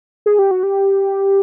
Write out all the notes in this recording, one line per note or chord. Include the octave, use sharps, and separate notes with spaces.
G#4
G4
F#4
G4